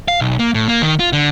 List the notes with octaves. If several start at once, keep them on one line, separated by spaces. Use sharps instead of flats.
F5
B1
A#3
A2
A#3
D#3
F4
D3